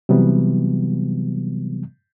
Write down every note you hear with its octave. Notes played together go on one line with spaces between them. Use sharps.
C3 E3 F#3 G3 B3